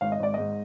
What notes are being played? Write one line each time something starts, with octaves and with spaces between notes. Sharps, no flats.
G#1 F5
D#5
G#1 D5
G#2 D#5